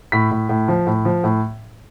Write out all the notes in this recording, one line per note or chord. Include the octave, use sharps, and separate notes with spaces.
A2 B6
A2
A2
F3
A2
F3
A2